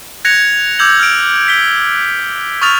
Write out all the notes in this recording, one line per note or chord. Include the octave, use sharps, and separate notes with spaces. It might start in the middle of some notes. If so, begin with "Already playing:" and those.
F#6 G#6 A#6 C#7 F7
D6 E6 G6 G#6 F#7
F6 D7
B6 G7
C#6 D#6 F6 A6 F7